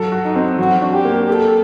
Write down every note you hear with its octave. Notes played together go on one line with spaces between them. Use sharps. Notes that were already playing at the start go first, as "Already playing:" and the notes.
Already playing: F#3 A4
F#4
D#4
C4
F#3 F#4
D4
G4
A#3
G4 A4